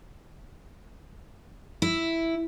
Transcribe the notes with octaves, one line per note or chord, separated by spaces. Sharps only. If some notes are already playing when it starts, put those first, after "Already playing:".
E4